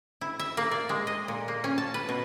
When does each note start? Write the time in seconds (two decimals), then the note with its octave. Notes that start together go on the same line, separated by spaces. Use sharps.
0.21 E4
0.39 E5
0.57 A#3
0.71 D5
0.89 G#3
1.07 D#5
1.28 A#2
1.48 A#3
1.64 C#4
1.78 A5
1.94 B4
2.09 B2